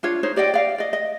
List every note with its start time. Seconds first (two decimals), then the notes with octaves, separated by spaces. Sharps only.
0.03 D4 F4 C#5
0.23 D#4 C5 C#5
0.36 G4 D5 D#5 G5
0.54 D5 F5
0.78 D5 D#5
0.93 D#5